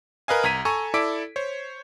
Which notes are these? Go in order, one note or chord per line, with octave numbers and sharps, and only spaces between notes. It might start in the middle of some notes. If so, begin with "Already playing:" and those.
A#4 B4 D#5 F5 G#5
C2 A#5 G#6 B6 D#7
A4 G#5 A#5 C#6
E4 A4 D5 D6 B6 D7
C5 C#5